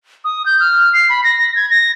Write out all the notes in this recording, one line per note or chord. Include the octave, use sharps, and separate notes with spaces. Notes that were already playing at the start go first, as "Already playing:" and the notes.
D#6
G6
F6
C7
B5
A#6
G#6
A#6